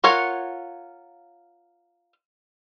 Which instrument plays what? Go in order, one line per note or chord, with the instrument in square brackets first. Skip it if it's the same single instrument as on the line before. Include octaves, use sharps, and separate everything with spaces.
[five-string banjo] F4 A#4 C#5 F5 F#5